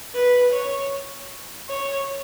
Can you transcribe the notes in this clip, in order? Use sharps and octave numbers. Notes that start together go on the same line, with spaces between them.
B4
C#5
C#5